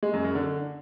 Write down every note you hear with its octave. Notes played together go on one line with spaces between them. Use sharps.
G#3
F#2
F#2
D3